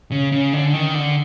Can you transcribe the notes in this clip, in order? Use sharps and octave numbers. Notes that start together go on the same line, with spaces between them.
C#3
C#3
D3
D#3
D3